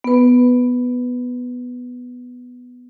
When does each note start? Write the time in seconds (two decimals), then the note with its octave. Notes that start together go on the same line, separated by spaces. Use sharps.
0.04 B3 B4